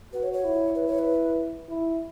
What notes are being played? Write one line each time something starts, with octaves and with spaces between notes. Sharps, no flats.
F#4 B4
C#5
C#5
E4
B4
C#5
B4
E4